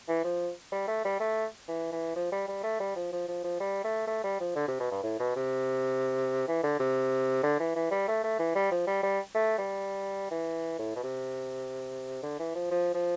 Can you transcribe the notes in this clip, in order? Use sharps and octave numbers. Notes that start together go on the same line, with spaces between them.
E3
F3
G3
A3
G3
A3
E3
E3
F3
G3
G3
A3
G3
F3
F3
F3
F3
G3
A3
A3
G3
F3
D3
C3
B2
G2
A2
B2
C3
E3
D3
C3
D3
E3
E3
G3
A3
A3
E3
G3
F3
G3
G3
A3
G3
E3
A2
B2
C3
D3
E3
F3
F3
F3